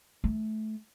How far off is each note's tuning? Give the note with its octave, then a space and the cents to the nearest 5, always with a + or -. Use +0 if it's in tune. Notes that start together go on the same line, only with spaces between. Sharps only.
A3 -20